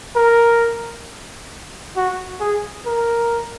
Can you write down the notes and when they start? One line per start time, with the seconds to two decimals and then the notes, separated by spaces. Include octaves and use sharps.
0.16 A#4
1.96 F#4
2.40 G#4
2.86 A#4